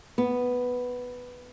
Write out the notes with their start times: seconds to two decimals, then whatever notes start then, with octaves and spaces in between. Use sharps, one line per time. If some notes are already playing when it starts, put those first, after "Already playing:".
0.18 B3